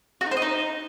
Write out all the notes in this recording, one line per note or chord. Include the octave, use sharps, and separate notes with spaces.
F#4
D#4
C5
D#5
D#4